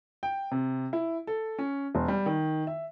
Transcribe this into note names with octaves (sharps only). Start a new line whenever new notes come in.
G5
C3
E4
A4
C#4
E1
G3
D#3
E5